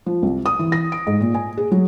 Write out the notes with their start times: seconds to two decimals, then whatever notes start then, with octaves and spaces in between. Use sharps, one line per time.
0.06 F3
0.22 C2
0.46 D#6
0.59 E3
0.72 A#6
0.92 D7
1.07 G#2
1.21 A#2
1.34 G#5
1.57 G#4
1.71 F#3